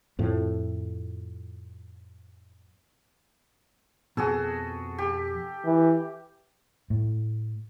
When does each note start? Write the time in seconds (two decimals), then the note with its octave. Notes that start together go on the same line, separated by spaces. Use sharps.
0.19 F2 A2 F3
4.17 F2 B2 F#4 G#4 A4
4.98 G4
5.65 E3
6.90 A2